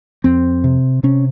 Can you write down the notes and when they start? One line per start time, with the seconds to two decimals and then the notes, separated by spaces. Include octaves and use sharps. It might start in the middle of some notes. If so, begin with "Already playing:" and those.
0.24 F2 C4
0.64 C3
1.03 C3 C#4